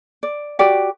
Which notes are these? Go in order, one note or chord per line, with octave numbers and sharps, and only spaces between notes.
D5
F#4 G4 D5